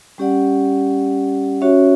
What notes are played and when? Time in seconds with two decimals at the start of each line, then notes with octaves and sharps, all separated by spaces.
0.18 G3 C#4 G4 D5 F#5
1.61 C#4 F#4 C#5 E5